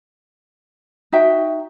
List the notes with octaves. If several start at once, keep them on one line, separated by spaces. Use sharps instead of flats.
D#4 F#4 E5 G5